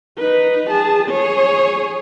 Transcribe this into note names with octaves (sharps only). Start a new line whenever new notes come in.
D#4 B4
G#4 A5
G#4 C#5